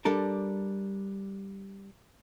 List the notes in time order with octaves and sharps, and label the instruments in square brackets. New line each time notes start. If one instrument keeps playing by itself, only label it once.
[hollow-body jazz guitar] G3 D4 A4 A#4